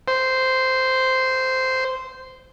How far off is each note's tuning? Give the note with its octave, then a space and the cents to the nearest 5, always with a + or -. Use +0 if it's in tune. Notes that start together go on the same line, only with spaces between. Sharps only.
C5 -10